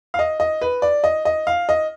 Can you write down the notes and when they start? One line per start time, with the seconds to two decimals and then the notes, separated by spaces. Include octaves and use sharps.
0.14 F5
0.19 D#5
0.40 D#5
0.61 B4
0.82 D5
1.04 D#5
1.25 D#5
1.47 F5
1.69 D#5